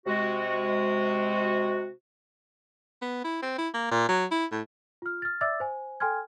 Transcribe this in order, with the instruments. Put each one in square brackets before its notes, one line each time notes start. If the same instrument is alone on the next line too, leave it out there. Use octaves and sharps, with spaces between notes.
[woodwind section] C3 G#3 F#4
[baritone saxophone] B3
E4
C4
E4
A#3
A#2
F#3
E4
A2
[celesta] F4 F6
F6 A6
D5 E5 D6 E6 A6
C5 G#5
A4 G5 G#5 C6 F6 G#6